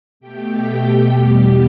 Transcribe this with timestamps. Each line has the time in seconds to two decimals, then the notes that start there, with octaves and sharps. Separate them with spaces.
0.20 B2 A3 G4 G5
0.66 G4
1.11 E2 B2 G3